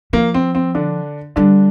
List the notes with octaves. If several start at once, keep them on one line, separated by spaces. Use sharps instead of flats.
F3 A#3
C4
C4
D3 D4
D3 G3 D4